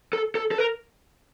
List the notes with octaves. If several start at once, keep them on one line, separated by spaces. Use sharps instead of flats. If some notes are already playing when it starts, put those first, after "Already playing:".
A4
A4
A4
A#4